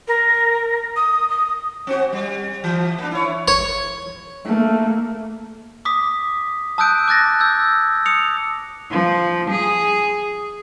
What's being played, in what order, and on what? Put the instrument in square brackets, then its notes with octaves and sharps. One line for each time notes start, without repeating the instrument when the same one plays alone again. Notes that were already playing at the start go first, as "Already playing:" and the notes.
[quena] A#4
D#6
D#6
[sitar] C4 F#4
G3
E3
A#3 D4
E4 C#5
[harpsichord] C#5
[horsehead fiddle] A3 A#3
[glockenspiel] D6 D#6 B6
A5 D#6 E6 F#6 G6 D7
D6 F#6 A6 A#6
E6 G6 G#6
D#6 C#7 F7
[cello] F3
G#4